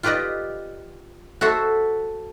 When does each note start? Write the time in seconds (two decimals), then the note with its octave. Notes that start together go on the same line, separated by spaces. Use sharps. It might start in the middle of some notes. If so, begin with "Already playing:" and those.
0.03 F4 G4 B4 D5 D#5
1.41 F#4 A4 C5 E5